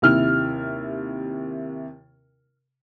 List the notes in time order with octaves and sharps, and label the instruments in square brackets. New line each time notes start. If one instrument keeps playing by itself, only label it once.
[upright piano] D#2 C3 E4 F6